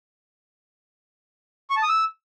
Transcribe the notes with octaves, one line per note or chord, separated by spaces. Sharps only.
C#6
A5
D#6
E6